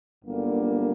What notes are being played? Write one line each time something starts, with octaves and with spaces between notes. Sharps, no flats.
G1 F#2 D3 G3 A#3